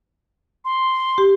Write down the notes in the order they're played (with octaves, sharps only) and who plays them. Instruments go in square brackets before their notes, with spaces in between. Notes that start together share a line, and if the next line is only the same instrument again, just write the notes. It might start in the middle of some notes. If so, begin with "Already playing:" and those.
[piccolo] C6
[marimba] G4